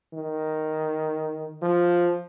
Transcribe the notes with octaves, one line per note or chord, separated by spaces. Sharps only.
D#3
F3